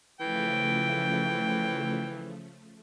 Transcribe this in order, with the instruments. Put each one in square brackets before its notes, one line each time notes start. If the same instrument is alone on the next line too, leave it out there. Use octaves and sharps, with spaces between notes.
[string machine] C#3 F3 A3 [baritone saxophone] E3 [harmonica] G5